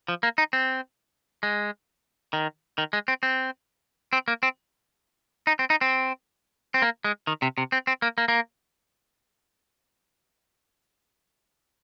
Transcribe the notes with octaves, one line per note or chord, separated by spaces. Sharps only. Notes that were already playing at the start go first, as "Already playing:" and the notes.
F3
A#3
D#4
C4
G#3
D#3
D#3
G#3
C4
C4
C4
A#3
C4
D#4
C4
D#4
C4
C4
A#3
G#3
D#3
C3
C3
C4
C4
A#3
A#3
A#3